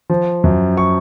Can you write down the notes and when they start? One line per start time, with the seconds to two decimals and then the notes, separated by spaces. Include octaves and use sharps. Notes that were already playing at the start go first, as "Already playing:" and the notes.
0.09 F3
0.44 F#2
0.77 C#6